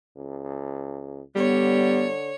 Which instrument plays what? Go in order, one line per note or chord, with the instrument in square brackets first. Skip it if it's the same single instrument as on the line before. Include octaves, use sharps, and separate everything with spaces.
[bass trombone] C#2
[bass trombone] D3 [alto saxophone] G3 [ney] B3 [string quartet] C#5